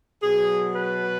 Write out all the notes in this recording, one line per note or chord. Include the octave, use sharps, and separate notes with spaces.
B2 F#3 G#4
B4